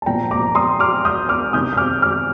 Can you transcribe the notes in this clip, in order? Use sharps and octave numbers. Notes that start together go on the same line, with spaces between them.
A5
A#2 F3 G5 A#5
A#5 D6
C6 D#6
D6 F6
D#6 G6
D6 F6
C3 D#3 D#6 G6
G6
D6 F6
D6 F6